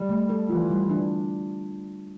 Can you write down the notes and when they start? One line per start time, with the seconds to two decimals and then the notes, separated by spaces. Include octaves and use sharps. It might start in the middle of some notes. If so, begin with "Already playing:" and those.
Already playing: G3
0.09 A3
0.29 A4
0.49 E3 F4
0.69 G3
0.90 D4